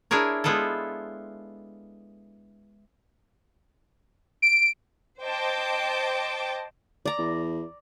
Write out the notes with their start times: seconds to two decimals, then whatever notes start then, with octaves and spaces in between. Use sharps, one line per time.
0.11 D4 E4 G#4 A#4 C#5
0.44 G#3 B3 E4 F4 A4
4.42 D7
5.24 C5 D#5 G5 A5 D6
7.06 D5 A#5
7.19 E2